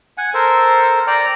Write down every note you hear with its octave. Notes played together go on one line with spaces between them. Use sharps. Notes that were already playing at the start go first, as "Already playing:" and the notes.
F#5 G#5
A4 A#4 C5
D5 G5 A#5